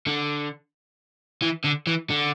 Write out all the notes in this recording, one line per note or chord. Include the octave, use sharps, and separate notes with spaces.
D3
E3
D3
E3
D3